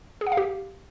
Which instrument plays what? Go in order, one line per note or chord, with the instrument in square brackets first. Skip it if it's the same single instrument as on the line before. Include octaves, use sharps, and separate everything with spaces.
[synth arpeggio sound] G#4
F#5
F5
G4